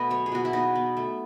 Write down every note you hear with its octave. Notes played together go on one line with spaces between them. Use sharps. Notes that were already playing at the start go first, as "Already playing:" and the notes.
Already playing: B2 A3 A4 B4 D#5
F#3 C#5
G#4
B2 F#4
E4
B2 D#4
B3
A3